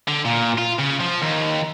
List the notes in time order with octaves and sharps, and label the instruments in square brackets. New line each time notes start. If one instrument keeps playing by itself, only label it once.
[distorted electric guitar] D3
A#2
F4
C#3
F3
D#2